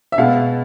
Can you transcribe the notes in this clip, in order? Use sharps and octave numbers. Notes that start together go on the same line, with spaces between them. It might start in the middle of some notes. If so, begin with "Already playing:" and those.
E5
B2 G#3 B3 F5